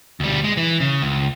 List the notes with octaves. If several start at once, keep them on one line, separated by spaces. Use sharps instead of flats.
D2 G3
G#3
E3
C#3
C#2